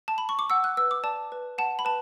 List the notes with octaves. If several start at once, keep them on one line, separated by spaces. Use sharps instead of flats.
A5
B5
C#6
D6
F#5 E6
F#6
B4 E6
D6
D5 A5
B4
F#5 A5
B5
B4 A5